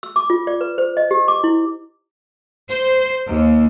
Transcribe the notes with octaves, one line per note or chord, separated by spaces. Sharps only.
E6
D6
F4
D5
B4
C5
D#5
G4
D6
E4
C5
D#2